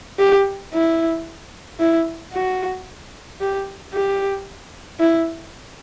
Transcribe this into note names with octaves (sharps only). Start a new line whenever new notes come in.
G4
E4
E4
F#4
G4
G4
E4